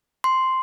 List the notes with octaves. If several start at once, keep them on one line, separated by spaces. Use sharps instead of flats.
C6